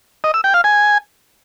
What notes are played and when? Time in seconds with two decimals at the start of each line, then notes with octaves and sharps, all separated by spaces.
0.24 D#5
0.34 E6
0.44 G5
0.54 F5
0.64 G#5